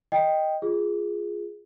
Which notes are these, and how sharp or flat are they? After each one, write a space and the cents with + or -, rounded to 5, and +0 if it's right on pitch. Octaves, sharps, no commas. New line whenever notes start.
D#5 +0 G5 +0
F4 +0 G#4 +0